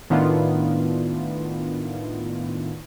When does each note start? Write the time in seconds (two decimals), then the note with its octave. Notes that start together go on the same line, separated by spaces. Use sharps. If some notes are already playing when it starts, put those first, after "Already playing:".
0.10 A2 D#3 B3 D4 E4 F4